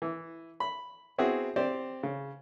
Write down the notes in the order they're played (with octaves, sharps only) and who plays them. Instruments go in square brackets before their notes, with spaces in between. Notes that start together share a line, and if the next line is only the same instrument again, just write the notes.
[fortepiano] E3
B5
B3 C4 E4 F#4 G#4
C4 G4 C5 D5
C#3